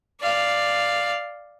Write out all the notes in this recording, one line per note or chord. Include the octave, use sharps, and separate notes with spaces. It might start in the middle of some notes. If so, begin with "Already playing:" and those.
D5 F5